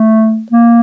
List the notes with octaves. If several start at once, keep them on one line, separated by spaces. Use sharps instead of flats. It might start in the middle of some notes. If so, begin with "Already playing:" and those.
Already playing: A3
A#3